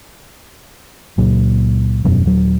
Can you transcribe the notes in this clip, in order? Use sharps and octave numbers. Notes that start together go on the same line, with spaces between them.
C#2 A#2 F#3
E1 F#2 B2
D#1 F#3